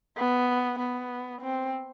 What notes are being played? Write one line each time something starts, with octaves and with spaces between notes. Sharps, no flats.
B3
B3
C4